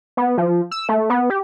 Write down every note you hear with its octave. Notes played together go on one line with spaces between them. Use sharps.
B3
F3
E6
A3
B3
G4